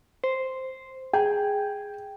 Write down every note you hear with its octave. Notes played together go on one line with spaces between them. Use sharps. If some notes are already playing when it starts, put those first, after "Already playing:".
C5
G#4 G5